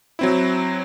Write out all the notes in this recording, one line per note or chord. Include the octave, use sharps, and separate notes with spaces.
F#3 C4 E4